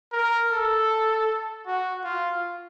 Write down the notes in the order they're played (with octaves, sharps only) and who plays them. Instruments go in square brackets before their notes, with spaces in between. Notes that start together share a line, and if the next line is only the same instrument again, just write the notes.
[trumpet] A#4
A4
F#4
F4